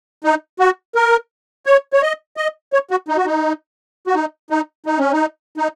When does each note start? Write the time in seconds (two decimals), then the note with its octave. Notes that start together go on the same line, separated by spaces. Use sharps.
0.24 D#4
0.60 F#4
0.95 A#4
1.66 C#5
1.93 C#5
2.02 D#5
2.37 D#5
2.73 C#5
2.91 F#4
3.08 D#4
3.17 F#4
3.26 D#4
4.07 F#4
4.15 D#4
4.50 D#4
4.86 D#4
4.99 C#4
5.12 D#4
5.57 D#4